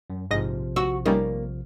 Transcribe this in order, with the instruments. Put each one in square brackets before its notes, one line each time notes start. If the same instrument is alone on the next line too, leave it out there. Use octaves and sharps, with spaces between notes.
[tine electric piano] F#2
[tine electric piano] A#1 C3 F3 [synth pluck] G#2 D#5 A#6
[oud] F#4 [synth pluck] E6
[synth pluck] G3 C#4 D#4 [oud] A#3